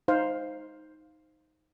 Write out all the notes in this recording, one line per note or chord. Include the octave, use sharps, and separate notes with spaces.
D#4 C5 F5